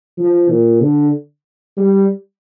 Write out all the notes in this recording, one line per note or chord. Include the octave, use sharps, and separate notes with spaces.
F3
A#2
D3
G3